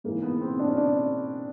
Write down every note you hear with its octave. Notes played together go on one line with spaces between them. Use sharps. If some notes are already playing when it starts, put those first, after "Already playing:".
G#2 E3 A#3
B3
C4
D4
C#4
D4